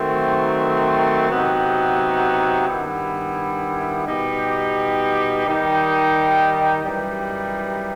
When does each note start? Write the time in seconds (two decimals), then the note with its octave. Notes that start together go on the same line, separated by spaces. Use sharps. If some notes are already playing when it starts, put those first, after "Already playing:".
Already playing: D#3 F#3 A3 C4
1.29 C3 F#3 B3 D#4 G4
2.67 G2 D#3 G3 B3 E4
4.06 B2 G3 D#4 G4
5.45 D#3 G3 D#4 G4
6.84 F#2 E3 G3 D#4 G4